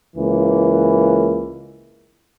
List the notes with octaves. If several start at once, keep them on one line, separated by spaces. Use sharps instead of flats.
C#2 E3 A#3